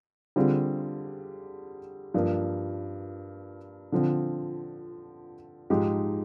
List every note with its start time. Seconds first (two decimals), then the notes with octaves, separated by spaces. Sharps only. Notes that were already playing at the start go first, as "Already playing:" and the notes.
0.36 D3 G3 C4 F4 G#4
2.14 G2 F3 A#3
3.92 D3 F3 C4
5.70 G#2 F3 G#3 D#4 G4